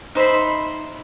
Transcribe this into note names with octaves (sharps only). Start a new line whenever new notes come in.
D#4 C5 E5 B5